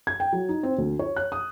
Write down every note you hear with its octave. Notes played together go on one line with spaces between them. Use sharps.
G#6
G5
F#3
D#4
C4
D2
C#5
F#6
D#6